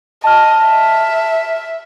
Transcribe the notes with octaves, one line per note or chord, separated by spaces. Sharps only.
D#5 A5 F6
E5